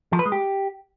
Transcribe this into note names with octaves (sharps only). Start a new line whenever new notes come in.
F3
B4
G#3
G4